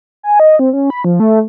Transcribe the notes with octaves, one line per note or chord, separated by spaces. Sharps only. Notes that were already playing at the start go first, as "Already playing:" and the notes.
G#5
D#5
C4
C#4
B5
F3
A3